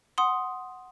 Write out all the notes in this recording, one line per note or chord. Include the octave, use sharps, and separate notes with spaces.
F#5 C6 D#6